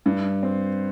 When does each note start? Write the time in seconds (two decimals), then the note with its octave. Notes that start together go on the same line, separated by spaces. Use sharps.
0.06 G2
0.43 C4